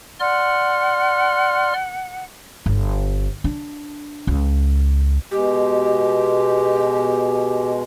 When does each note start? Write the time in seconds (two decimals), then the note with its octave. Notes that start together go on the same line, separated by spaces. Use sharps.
0.20 D5 F#5 C6 F6
2.66 G1
3.44 D4
4.27 C#2
5.31 B2 G#3 G4